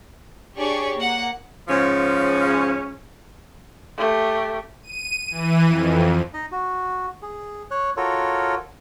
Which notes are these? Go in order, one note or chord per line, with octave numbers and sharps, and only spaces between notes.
D4 G4 G#4 C#5 D5 C#6
A#3 F#5
G#2 C#3 F3 C#4
A3 G4
D#7
E3
F2
D#4 D#5
F#4
G#4
C#5 F#6
F4 F#4 A4 A#4 C#5